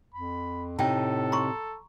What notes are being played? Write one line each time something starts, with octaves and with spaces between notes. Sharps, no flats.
F2 B5
A2 C3 D#4 A4 G5 A5
A#5 C6 C#6